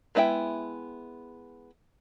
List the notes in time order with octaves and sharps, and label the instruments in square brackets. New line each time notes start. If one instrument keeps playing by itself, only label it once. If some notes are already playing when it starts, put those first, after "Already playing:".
[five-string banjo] G#3 B3 E4 E5 G5